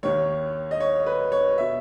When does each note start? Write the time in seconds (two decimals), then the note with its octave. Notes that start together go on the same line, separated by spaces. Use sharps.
0.03 D#2 D#3 C#5
0.71 D#5
0.80 C#5
1.06 B4
1.32 C#5
1.58 B2 E5